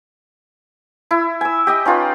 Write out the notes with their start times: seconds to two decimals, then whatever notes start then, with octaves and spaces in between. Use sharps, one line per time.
1.11 E4
1.41 G#5 E6
1.67 G4 D#5 G5
1.85 C#4 D#4 F4 B4